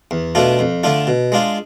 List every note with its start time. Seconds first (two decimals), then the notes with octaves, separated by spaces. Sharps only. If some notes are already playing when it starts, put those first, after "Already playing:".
0.11 E2
0.35 B2 A3 D4 F4
0.59 F2
0.83 D3 A3 D4 F4
1.07 B2
1.32 G#3 D4 F4